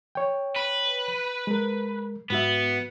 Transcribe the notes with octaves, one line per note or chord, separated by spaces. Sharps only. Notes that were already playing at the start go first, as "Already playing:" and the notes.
C#5 G5
B4
G#3 A#4
G#2 B3 F#4 E5